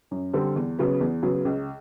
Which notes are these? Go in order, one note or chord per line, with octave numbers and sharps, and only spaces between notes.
F#2
D3 G3 C4
E2
C#3 F#3 B3
E2
C#3 F#3 B3
C#2